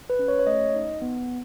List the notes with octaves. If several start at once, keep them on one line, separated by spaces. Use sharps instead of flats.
B4
C#4
C#5
C#5
A3 D#5
D#4
B3